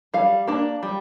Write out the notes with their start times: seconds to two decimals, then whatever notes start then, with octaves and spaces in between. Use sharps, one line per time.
0.14 G3 F5
0.47 A#3 D4
0.83 G3